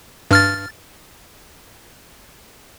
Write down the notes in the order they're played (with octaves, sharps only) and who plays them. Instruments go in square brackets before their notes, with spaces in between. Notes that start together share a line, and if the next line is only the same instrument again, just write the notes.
[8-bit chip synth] G2 F6 A6